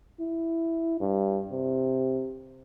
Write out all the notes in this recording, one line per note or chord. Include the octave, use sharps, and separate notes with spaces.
E4
G2
C3